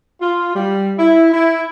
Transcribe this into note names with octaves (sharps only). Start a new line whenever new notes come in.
F4
G3
E4
E4